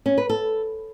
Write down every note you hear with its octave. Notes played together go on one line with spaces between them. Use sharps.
C#4
B4
A4